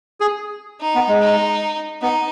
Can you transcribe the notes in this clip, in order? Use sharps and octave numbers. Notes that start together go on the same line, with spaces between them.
G#4
D#4
B3
G#3
D#4
B3 D#4